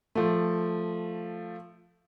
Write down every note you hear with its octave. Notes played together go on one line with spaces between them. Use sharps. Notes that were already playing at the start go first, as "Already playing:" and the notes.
F3 A3